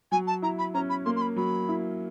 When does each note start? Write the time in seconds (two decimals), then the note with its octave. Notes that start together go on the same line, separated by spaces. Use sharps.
0.12 F#3 G#5
0.27 A5
0.42 E4 A#5
0.58 B5
0.74 C#4 A#5
0.89 B5
1.05 A#3 C6
1.16 C6
1.21 B5
1.36 F#3 B5
1.69 E4